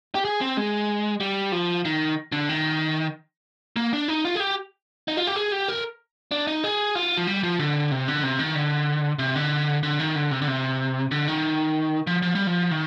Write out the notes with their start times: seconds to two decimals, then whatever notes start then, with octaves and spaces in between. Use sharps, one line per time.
0.15 G4
0.25 G#4
0.41 C4
0.57 G#3
1.20 G3
1.52 F3
1.85 D#3
2.32 D3
2.49 D#3
3.76 A#3
3.93 D4
4.08 D#4
4.25 F4
4.35 G#4
4.40 G4
5.08 D#4
5.17 F4
5.27 G4
5.36 G#4
5.52 G4
5.68 A#4
6.31 D4
6.47 D#4
6.64 G#4
6.95 F4
7.17 F3
7.27 G3
7.43 F3
7.60 D3
7.91 C3
8.08 D3
8.23 C3
8.39 D#3
8.55 D3
9.19 C3
9.36 D3
9.83 D3
9.99 D#3
10.15 D3
10.31 C3
10.42 D3
10.48 C3
11.11 D3
11.28 D#3
12.07 F3
12.22 F3
12.35 G3
12.47 F3
12.71 D#3